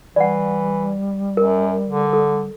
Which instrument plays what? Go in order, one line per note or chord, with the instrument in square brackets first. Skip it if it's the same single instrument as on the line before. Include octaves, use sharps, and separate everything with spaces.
[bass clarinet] E3 [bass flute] G3 [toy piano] D5 F#5
[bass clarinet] F#2 [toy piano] A#4
[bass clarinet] D3
[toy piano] A4